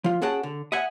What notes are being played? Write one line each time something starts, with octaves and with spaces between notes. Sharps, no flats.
F3 F4
C#4 F#4 G#4 F#5 G5 A5
D3
D#5 E5 F#5 G#5